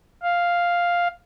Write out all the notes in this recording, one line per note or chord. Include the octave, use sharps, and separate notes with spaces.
F5